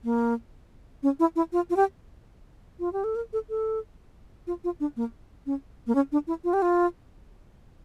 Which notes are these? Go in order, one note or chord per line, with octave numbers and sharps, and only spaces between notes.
A#3
C#4
E4
E4
F4
F4
G4
F4
G4
A4
A#4
A4
A4
F4
F4
D4
A#3
C#4
A#3
C#4
D4
E4
F4
G4
F4